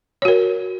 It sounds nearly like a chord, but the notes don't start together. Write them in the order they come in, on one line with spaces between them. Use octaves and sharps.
C#5 F#4 A#4